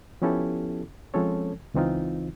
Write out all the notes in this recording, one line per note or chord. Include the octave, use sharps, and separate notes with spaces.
F3 B3 C#4 E4 G4 A4
F3 G#3 C4 C#4 A4 C#5
C#2 E3 C4 D#4 F4